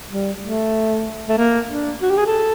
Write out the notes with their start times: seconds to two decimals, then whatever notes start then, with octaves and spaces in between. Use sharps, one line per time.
0.09 G3
0.42 A3
1.29 A3
1.38 A#3
1.69 D4
2.02 F#4
2.10 G4
2.17 G#4
2.27 A4